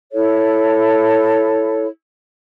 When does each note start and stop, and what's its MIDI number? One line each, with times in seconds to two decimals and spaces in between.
0.12 1.86 64
0.12 1.86 69
0.12 1.86 73